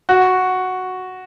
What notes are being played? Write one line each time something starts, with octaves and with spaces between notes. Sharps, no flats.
F#4